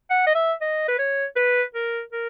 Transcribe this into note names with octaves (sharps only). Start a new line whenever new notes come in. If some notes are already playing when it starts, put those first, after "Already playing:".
F#5
D#5
E5
D#5
B4
C#5
B4
A#4
A#4